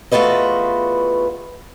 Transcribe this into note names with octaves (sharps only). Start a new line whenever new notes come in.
E2 A3 F4 F#4 B4 D#5